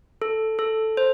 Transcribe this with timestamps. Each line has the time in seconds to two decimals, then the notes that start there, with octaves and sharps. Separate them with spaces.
0.22 A4
0.59 A4
0.97 C5